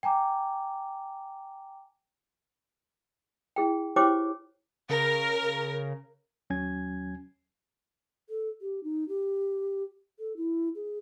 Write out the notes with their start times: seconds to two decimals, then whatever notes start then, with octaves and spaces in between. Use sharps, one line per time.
0.03 G5 G#5 A#5 D6
3.56 E4 G#4 G5
3.96 E4 G4 C5 C#5 G5 D6
4.90 C#3 A#4
6.50 D#2 F#3 C#4 G#5 G#6
8.30 A4
8.61 G4
8.84 D#4
9.09 G4
10.19 A4
10.37 E4
10.75 G#4